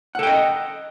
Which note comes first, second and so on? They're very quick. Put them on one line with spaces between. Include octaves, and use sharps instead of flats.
F#5 A4 G5 D#5